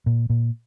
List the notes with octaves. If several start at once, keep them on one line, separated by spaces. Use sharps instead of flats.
A#2
A#2